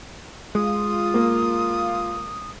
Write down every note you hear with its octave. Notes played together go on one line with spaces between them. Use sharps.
G#3 F4 D#6
A#3